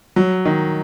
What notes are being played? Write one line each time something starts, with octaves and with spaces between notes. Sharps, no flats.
F#3
D#3